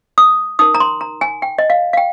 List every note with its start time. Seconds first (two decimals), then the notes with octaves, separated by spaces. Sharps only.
0.18 D#6
0.59 D#4 A#4 D#6
0.74 A#5
0.80 C6
1.01 A#5
1.21 G#5
1.42 G5
1.58 D#5
1.70 F5
1.93 F5
1.97 G5